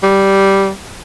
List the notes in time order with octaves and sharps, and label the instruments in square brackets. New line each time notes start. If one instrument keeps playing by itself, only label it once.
[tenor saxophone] G3